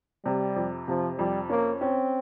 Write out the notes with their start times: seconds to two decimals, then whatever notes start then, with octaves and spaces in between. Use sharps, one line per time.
0.25 C3 G3
0.56 F2
0.88 C3 F3
1.18 F2 G3
1.49 A#3 C#4
1.80 C4 C#4